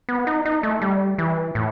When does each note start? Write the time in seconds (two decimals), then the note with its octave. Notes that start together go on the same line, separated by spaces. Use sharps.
0.09 B3
0.27 D#4
0.45 D#4
0.63 A3
0.82 G3
1.18 E3
1.55 A2